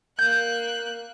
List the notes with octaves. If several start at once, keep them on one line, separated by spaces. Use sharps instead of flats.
A#3 F#6 G6